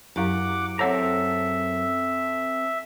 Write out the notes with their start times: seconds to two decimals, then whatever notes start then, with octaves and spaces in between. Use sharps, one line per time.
0.16 F#2 E4 G4 F5 F#5 D6
0.79 C4 G#4 A4 C#5 E5 F#5 A#5